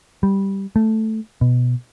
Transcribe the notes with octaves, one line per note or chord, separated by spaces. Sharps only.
G3
A3
B2